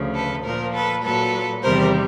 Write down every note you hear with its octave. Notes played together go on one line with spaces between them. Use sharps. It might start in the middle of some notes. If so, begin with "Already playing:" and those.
Already playing: D2 C#3 F3
A4 B4
A#2 F3 A#4 C5
A4 B4
A#2 F#3 A4 B4
E2 C3 D#3 G3 A#4 C5